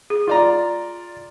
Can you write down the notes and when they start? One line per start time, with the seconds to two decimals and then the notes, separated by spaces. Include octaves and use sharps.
0.10 G#4
0.27 F4 D5 A#5